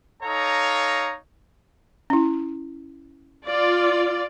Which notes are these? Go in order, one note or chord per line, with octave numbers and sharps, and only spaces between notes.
D#4 A4 C#5 F5 A#5
C#4 E4
F4 D5